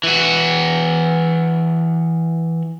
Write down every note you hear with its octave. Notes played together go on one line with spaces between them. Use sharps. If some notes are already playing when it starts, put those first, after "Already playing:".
E3 F#4